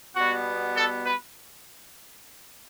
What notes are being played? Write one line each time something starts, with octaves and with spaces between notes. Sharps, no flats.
B2 G3 B3 F#4
A4
B4